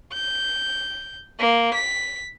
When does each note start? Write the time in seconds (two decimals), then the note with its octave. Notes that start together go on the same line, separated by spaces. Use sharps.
0.13 G6
1.39 A#3
1.74 B6